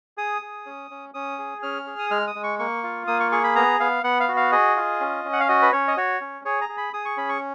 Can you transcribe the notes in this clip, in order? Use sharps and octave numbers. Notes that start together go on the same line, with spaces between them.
G#4 D#6
G#4
C#4
C#4
C#4 D#6
G#4
C#4 F6
G#4
D#6
G#3 F6
D#6
G#3
C#6
A#3 C#6
F4
A#3 D#6
C#6
G#4 C#6
B5
B3 A#5
B3 F5
B3 F#5
F5
F#4
F5
G#4 D#5
F4
C#4
C#4
F#5
F5
F#4 D#5
B4
C#4 C#5
D#5
F#4 C#5
C#4
G#4 C#5
A#5
G#4
B5
G#4 D#6
C#6
C#4 B5
C#6